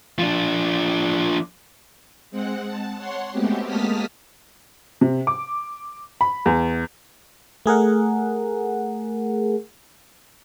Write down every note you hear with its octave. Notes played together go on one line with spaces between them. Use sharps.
F3 D4
G#3 C4 F#5
A5
C#5 F#5 C6
G#3 A3 B3 C4 F#4 G4
G#3 A#3 A5 D#6 F6 B6
C3
D6
B5
E2
A3 G#4 A#4 F#5